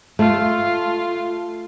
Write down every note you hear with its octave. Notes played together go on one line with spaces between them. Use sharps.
A3 F4